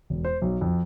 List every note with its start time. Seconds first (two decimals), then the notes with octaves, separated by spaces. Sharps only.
0.10 E1
0.24 C5
0.42 B1
0.61 F2